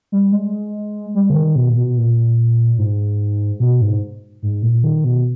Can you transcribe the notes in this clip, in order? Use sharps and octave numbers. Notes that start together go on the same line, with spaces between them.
G3
G#3
G3
C#3
D#3
B2
A#2
B2
A#2
G#2
B2
G#2
G#2
A#2
D#3
B2